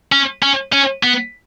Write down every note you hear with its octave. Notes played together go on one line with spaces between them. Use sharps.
C#4
C#4
C#4
B3